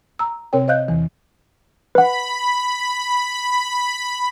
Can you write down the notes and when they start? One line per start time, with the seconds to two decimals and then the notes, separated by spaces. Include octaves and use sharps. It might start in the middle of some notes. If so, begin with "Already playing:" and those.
0.19 A#5 E6
0.53 C3 C4 A#4 C#5 G5
0.68 C5 D#5 F5 F#6 G6
0.88 E2 E3
1.95 B4 F#5 B5